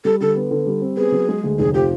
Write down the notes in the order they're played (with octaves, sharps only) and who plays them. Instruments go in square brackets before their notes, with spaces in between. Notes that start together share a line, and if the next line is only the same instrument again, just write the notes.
[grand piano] G3 [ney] A4
[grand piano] D3 [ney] A4
[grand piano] B3
D3
G3
C4
[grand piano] B3 [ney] G#4
[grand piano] F#3
G#3
D2
[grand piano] F1 [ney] G#4
[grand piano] F3 [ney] G4